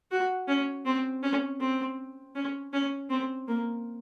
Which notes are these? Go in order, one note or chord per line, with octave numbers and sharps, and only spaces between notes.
F#4
C#4
C4
C#4
C4
C#4
C#4
C4
A#3